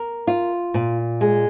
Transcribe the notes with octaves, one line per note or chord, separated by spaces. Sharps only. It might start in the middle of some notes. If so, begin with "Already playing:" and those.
Already playing: A#4
F4
A#2
G#3